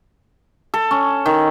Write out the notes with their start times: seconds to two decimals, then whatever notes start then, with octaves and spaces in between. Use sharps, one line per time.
0.74 A4
0.91 C#4
1.26 D#3